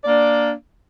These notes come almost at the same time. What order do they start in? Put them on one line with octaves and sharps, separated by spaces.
D5 A#3 D4